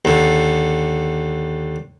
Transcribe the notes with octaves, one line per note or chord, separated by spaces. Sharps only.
D#2 D3